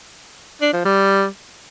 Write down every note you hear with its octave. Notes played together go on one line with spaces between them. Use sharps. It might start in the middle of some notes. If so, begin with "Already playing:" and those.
D4
F3
G3